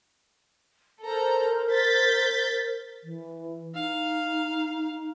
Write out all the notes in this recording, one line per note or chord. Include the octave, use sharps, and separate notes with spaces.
A4 A#4 C5 A#5
G6 A6 B6
E3
D#4 F5